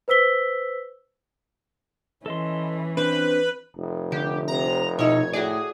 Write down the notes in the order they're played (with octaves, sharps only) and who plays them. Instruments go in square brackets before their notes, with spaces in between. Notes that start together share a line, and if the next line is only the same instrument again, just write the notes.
[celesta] B4 C5 E6 B6 G7
[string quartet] E3 C#4 [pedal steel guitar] A4 D#5 C6
[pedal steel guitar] C4 D4 C5 [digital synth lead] B4
[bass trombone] F1
[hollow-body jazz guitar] D3 [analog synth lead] G4
[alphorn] C3 [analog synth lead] A#5
[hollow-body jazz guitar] B2 E4 [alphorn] D#4 [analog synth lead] C#5
[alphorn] A2 [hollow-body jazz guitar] F#4 D5 [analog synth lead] G#4